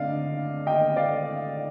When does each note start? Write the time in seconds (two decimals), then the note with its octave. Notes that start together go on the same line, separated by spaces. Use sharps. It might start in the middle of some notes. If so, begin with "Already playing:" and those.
Already playing: D3 A3 D5 D#5 F5
0.66 D#5 G5
0.96 D5 F5